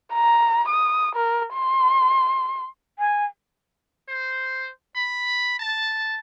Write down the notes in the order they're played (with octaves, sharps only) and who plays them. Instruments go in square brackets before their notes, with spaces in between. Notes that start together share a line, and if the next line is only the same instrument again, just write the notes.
[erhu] A#5
D#6
A#4
C6
[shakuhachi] G#5
[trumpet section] C5
B5
A5